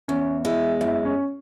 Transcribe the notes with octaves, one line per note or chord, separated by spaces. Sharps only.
E2 C#4
G#3 E4
F#2 E4
C#4